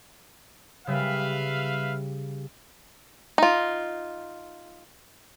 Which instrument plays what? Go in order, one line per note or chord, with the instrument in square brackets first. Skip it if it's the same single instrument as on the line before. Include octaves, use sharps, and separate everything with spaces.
[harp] C#3 G3 [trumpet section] B4 E5 F5
[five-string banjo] D#4 F4